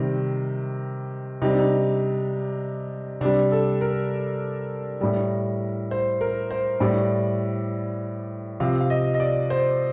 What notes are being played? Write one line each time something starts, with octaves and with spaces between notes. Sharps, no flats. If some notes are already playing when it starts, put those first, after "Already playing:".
Already playing: C3 D#3 G3
C3 G3 D#4
D4
D#4
C3 G3 D4
A4
A#4
A2 G3
C5
A#4
C5
A2 G3 D5
C3 F3 F5
F5
D#5
D#5
D5
C5